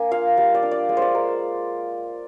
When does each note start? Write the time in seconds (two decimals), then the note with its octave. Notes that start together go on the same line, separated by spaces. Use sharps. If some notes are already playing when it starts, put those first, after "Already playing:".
Already playing: A#3 D4 G#5
0.11 F4 F5
0.37 G3 F5
0.54 D5
0.63 D4
0.71 D5
0.89 G#3 D#5
0.97 C5 D5
1.15 G#3 A#4